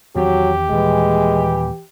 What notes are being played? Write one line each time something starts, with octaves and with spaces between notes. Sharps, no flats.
E2 D#3 F#3 C4 G4
D#2 A#2 E3 G3 G#3